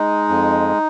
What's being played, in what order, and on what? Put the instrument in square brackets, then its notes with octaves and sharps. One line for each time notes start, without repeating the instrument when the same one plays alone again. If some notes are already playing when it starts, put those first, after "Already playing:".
Already playing: [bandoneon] G#3 D#4
F2